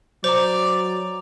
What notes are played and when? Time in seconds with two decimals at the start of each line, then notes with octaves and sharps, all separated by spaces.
0.24 F#3 C5 D5 A#5 D6 F7